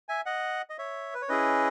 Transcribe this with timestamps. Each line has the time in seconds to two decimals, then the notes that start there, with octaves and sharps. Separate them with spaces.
0.09 E5 G#5
0.26 D#5 F#5
0.70 D#5
0.78 C#5 E5
1.14 B4
1.22 C#5
1.28 C#4 E4 G#4 B4 D#5